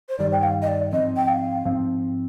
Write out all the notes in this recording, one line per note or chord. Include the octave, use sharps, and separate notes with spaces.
C5
G2 D#3 G3 D5
G5
F5
D#5
D5
G#2 F3 C4 D#5
G5
F5
G#2 F3 C4